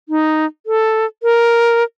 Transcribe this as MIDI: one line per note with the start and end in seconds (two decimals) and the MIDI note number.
0.09 0.46 63
0.66 1.06 69
1.23 1.83 70